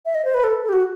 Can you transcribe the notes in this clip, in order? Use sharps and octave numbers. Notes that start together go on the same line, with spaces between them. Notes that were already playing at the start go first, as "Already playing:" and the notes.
E5
D#5
C5
B4
A4
A4
G4
F#4